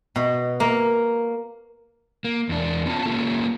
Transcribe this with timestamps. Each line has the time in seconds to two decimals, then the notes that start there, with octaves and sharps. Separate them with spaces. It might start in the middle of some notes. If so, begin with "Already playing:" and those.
0.16 B2
0.60 A#3
2.24 A#3
2.49 E2 D4
2.86 B3 C#4 F4 A5
3.05 A#3 C#4 F4 A4